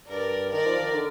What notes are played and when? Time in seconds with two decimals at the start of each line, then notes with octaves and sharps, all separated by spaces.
0.10 G2 A#4 D5
0.51 D#3 A#4 D5
0.66 F3
0.79 D#3
0.94 D3